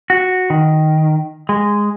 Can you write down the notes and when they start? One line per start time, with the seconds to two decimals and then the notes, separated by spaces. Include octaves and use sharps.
0.10 F#4
0.50 D#3
1.49 G#3